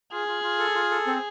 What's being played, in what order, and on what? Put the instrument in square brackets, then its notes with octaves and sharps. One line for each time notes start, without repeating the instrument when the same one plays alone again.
[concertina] F4 [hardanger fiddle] G#4
[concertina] F4
F4
A4
F4
A4
C4